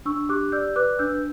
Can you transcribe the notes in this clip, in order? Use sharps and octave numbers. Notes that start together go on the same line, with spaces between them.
D4 C#6 E6
G4 D6 F#6
D5 E6 G6
B4 D6 F#6
D4 E6 G6